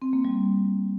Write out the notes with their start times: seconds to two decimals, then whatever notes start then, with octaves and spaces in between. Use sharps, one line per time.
0.02 C4
0.13 A#3
0.25 G3